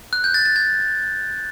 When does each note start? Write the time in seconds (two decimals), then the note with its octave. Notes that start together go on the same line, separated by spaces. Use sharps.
0.13 F#6
0.24 G6
0.34 A6
0.45 A6
0.56 G#6